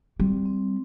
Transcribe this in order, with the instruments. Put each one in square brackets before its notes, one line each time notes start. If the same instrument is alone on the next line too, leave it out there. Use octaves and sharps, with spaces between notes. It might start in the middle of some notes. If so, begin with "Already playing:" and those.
[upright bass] G3 [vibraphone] C4
[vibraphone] C4